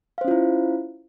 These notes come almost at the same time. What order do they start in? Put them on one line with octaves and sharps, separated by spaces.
F5 C5 C#4 F4 E4